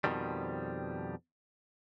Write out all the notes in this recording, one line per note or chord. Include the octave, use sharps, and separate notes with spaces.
F2 B2 D#3 F3 G3